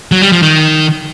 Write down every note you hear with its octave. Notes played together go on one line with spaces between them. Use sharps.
F#3
G3
F3
D#3